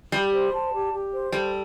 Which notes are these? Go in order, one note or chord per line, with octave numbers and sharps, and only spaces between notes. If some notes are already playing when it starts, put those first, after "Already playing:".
G3 G4
C5
A5
G4
G4
C5
G3 A4